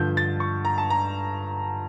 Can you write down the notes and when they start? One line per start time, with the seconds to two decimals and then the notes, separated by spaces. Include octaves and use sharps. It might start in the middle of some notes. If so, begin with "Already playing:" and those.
Already playing: G2 D3 F3 G6
0.17 A6
0.40 C#6
0.65 A#5
0.78 A5
0.90 A#5